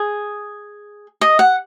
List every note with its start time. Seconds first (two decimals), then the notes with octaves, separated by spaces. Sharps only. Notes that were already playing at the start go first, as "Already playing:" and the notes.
Already playing: G#4
1.21 D#5
1.39 F#5